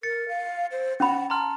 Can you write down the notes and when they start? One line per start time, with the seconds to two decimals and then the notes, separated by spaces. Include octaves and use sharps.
0.03 A#4 A6 C#7
0.29 F5
0.72 C5
1.00 C#4 F#5 B5
1.30 A5 A#5 C6 F6